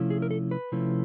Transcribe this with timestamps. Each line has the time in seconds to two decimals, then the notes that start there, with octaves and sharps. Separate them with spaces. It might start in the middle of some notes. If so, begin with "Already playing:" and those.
Already playing: C3 F3 A3 C#4 E4
0.10 G#4
0.22 A#4
0.31 A4
0.51 B4
0.72 C3 F3 A3 C#4 E4